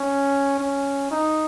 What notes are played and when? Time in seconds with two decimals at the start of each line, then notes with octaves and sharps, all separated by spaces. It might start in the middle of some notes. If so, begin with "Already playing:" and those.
Already playing: C#4
0.60 C#4
1.11 D#4